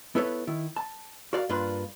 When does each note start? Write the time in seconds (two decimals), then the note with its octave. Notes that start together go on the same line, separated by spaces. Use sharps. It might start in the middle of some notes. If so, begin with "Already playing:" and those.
0.15 B3 E4 A4 B4 C#5
0.47 D#3 E4
0.76 A5
1.33 F#4 A#4 D5 F5
1.49 G2 A#3 D4 F4 B4 C6